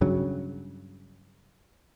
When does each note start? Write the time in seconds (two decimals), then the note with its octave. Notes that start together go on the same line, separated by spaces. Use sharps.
0.01 G2 C#3 F#3